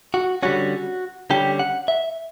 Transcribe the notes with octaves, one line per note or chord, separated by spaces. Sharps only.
F#4
D3 G3 C#4 F#4
D3 G3 C#4 G4
F#5
E5